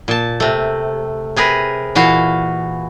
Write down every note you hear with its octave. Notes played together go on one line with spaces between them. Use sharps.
A#2 A5
C3 A3
C3 G#4 A#4 B4
A#2 E3 F#4 F5